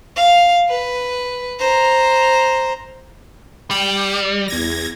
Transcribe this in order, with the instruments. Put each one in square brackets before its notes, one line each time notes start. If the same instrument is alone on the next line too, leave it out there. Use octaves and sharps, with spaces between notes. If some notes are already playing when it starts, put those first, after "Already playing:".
[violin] F5
B4
C5 A#5
[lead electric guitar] G3 [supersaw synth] G5
[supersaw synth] E2 G#6 A#6